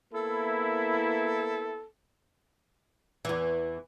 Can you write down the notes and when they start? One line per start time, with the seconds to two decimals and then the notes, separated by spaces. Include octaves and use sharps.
0.14 A#3 B3 E4 A4
3.25 E2 E3